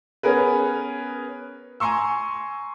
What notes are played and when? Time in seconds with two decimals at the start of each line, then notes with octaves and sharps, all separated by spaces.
0.23 B3 C#4 G#4 A#4 B4
1.80 G#5 A#5 C6 C#6 E6